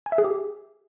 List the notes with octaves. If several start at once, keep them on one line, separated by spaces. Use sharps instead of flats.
G#5
E5
G#4
G4